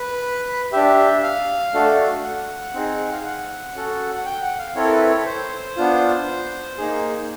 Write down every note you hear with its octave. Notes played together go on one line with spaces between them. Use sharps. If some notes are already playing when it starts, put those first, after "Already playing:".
Already playing: B4
D4 G4 E5
F5
A3 D4 F#4 A4
F#5
C4 D#4 G#4
F5
F#5
C#4 F#4 A4
F#5
G5
F#5
F5
C4 E4 A4 C#5
A#4
B4
C#5
C5
B3 D4 F4
A#3 D#4 G#4